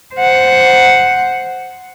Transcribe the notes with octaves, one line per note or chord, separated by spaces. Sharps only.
C5 F#5